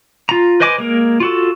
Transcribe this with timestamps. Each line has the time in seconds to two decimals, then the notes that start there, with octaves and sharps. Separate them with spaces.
0.29 F4 A#5
0.60 B4 C5 D#5 G#5 D6
0.78 G#3 A#3 A#4
1.20 F4 F#4 A4